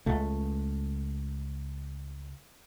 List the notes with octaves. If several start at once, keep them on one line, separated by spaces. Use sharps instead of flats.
C#2 A3